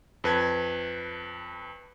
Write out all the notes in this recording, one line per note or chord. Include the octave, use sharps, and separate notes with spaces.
F2 B4 A5 G#6